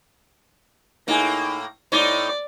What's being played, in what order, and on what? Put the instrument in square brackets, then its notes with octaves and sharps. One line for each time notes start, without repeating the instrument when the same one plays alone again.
[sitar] A2 A#3 [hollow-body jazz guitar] D#4 G#4
[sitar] A2 D#4 [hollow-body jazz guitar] C5 [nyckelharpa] D5